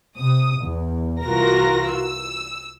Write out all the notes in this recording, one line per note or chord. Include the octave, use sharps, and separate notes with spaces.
C3 D#6
E2
C2 E3 F4 F#4 A#4 A#6
E6